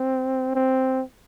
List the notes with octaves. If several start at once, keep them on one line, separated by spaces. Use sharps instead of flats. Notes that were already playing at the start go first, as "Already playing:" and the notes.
Already playing: C4
C4